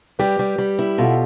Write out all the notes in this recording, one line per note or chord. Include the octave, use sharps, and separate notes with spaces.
G3 G4 B4
G3
G3
E4
B2 F4 A4